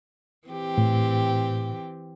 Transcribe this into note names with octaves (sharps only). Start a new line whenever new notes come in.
E3 C4 G4
A2